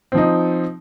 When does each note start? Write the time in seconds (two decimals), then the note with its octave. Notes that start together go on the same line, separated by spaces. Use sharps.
0.12 C4
0.15 F3
0.18 D#4